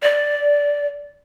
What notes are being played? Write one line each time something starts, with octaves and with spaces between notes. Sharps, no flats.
D5